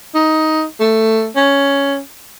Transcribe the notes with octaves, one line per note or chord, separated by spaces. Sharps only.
D#4
A3
C#4